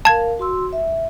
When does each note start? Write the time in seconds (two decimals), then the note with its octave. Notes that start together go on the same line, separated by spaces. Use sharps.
0.05 A#4 F5 A5 G#6
0.39 F#4 C6 E6
0.73 E5